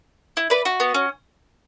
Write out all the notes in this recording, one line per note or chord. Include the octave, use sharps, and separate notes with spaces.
E4
B4 D5
F#4
B3
C#4